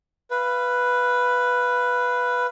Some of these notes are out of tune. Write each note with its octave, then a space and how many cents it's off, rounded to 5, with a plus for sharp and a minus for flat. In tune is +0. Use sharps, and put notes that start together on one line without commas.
B4 +0 F5 -20